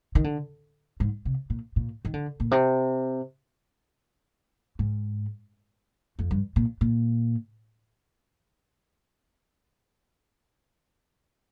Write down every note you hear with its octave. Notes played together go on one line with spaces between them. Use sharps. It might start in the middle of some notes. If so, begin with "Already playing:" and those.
D#3
D3
G#2
C3
A#2
A#2
D#3
D3
A#2
C3
G#2
F2
G2
A#2
A#2